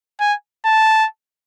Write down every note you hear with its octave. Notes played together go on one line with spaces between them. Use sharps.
G#5
A5